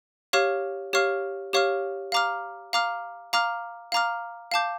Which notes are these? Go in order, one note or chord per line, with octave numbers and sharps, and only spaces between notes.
G4 C#5 F5 C#6 F6
G4 C#5 F5 C#6 F6
G4 C#5 F5 C#6 F6
F5 A#5 D6 F6
F5 A#5 D6 F6
F5 A#5 D6 F6
F5 A#5 D6 F6
F5 A5 D6 G6